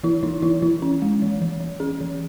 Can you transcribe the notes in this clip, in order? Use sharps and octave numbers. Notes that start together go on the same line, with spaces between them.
E3 E4
E3 D#4
E3 E4
E3 E4
C#4
G#3
E3
E3
E3
C#4 G#4
E3